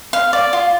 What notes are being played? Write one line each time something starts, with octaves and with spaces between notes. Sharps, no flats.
F5
D5
F4